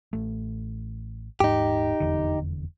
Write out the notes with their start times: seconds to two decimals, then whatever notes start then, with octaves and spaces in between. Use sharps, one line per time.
0.13 A1 A3
1.40 D#1 G#2 D#4 G4
2.00 F1 E2 D3